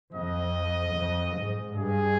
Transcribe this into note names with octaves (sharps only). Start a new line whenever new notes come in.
F2 D#5
F2
G#2
G2 G#4